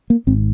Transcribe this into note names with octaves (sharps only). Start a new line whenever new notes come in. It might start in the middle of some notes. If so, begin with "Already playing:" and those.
A#3
G#1 G#2 C4